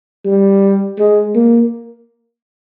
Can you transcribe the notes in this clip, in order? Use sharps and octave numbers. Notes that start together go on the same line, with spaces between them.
G3
G#3
A#3